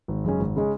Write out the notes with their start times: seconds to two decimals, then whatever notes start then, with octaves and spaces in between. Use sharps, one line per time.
0.08 G#1
0.24 F#2 C#3 G#3 C#4
0.39 G#1
0.56 C#3 G#3 C#4